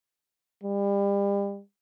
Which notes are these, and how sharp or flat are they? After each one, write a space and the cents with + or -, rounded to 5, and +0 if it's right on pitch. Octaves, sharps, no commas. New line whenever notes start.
G3 +35